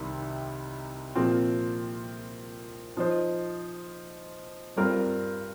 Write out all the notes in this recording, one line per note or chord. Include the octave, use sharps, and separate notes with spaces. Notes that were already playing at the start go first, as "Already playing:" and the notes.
Already playing: C2 C3 D#3 G3
A#2 F3 C4
F3 D#4 C5
G2 G3 C4 F4 A#4